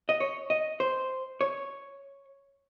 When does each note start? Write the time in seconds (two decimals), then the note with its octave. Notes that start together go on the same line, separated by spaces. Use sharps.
0.09 D#5
0.20 C#5
0.50 D#5
0.80 C5
1.41 C#5